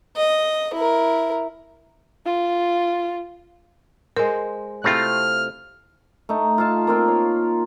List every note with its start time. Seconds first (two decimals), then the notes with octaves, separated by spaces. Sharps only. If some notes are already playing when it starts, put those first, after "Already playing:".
0.17 D#5
0.74 E4 A#4
2.25 F4
4.17 G#3 A#4 C5
4.84 C3 A3 C4 E4 F4 G5 F6
6.29 A3 D#4
6.58 F4 A4 F5 A5
6.87 A#3 C4 F4
7.08 C#5